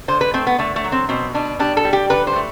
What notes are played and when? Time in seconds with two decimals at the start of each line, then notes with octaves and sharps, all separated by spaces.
0.08 D3 C5
0.21 B4
0.34 A3 C4
0.47 B3
0.58 D3 A3
0.76 A3
0.84 F#3
0.92 C4
1.09 B2 C4
1.34 B2 D4
1.59 G3 D4
1.77 A4
1.84 G3
1.93 G4
2.10 D3 B4
2.27 C5
2.36 A3